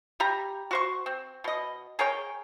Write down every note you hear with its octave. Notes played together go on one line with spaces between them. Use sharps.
G3 G4 A#5
F#4 C5 C#6
C4
B2 D#5
G#4 A#4 C#5 G5